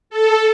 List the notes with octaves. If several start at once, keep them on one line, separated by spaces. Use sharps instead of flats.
A4